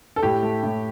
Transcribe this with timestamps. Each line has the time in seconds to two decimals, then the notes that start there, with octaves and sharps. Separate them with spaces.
0.16 A4
0.23 A2 G4
0.43 A3
0.63 A2